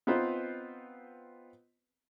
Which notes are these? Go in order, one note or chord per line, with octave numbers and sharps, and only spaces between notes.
B3 C4 D#4 F4 B4 C5